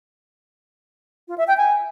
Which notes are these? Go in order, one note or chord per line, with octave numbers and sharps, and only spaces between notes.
F4
E5
G5
G#5